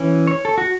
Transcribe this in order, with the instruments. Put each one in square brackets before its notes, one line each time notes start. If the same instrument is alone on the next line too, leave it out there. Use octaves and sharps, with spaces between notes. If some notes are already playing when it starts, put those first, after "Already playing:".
Already playing: [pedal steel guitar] E3 C#4
C#5
A4
F#4